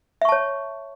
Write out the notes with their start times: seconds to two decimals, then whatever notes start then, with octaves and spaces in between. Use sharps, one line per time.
0.22 E5
0.25 C#6
0.29 A5
0.32 C#5